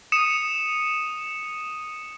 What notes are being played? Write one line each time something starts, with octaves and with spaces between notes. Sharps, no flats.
D#6 C#7 D#7 E7